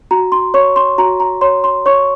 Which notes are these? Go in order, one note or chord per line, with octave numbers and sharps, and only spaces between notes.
F#4 A#5
C6
C#5 C#6
C6
F#4 A#5
A#5
C#5 C6
C6
C#5 C#6